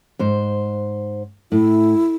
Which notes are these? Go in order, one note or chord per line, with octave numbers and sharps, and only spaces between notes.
G#2 C5
A2 E4